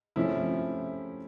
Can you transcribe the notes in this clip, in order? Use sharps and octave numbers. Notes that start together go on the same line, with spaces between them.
C3 F3 A3 C#4 E4